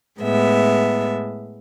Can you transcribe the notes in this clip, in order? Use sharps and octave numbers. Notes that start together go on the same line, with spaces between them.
A2 G#3 B3 E5